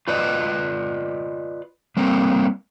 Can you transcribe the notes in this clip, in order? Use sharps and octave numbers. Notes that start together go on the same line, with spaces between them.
F4 B4 D5 D#5
G3 A#3 C4